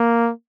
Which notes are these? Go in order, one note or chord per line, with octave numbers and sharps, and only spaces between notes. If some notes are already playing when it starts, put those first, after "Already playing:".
Already playing: A#3